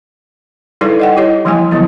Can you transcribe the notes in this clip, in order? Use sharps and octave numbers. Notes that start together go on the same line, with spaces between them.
G3 D#4 E4 A4 B4 D5
D#5 F#5 G5
E4 G4 C#5 D#5
E3 F3 G3 A#3 E4 G#5
D3 F3 F#3 B3 E4